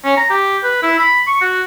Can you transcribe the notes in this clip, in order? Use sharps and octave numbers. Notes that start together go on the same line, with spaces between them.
C#4
A#5
G4
B4
E4
B5
C#6
F#4